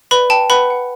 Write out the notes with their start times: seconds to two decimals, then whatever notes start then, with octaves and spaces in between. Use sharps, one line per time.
0.11 B4 D5 B5
0.30 G5 A5
0.50 B4 F#5 B5
0.70 F#5